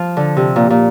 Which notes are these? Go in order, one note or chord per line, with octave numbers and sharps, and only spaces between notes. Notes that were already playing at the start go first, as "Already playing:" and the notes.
Already playing: F3
D3
C3
A#2
A#2